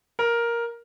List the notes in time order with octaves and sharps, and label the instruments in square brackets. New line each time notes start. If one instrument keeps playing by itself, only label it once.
[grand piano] A#4